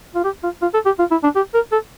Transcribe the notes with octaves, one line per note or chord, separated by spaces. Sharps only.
F4
G4
F4
F4
A4
G4
F4
E4
D4
G4
A#4
A4